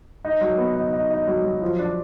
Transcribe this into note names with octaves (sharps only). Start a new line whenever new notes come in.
D#4
F#3
B3
D#4
D#4
D#4
F#3
F#3
F3
D4